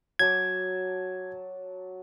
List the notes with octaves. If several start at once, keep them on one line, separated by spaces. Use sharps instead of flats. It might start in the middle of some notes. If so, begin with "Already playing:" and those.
F#3 A5 D6 G#6